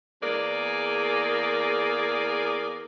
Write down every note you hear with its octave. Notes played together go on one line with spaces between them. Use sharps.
E2 A#3 G#4 D5